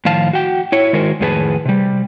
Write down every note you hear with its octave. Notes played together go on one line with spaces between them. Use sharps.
A2 D#3 F3 F5 A5
F#4 G5
E4 C#5
D#3 G#3 F#4 A#4 C5
F2 A2 D#3 G#4 B4 A5
C3 G3